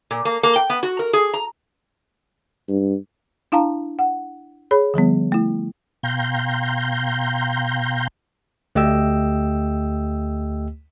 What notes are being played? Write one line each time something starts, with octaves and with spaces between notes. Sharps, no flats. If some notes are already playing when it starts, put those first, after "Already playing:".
A#2
A#3
A#3
G5
B3
F#4
A#4
G#4
A#5
G2
D4 E4 F5 A5 A#5
F#5
G#4 C#5 B5
D3 F3 G3 B3
A3 E4
B2 F5 G5 A#5 C6 G6
D2 A3 G4 D#5 G5 E6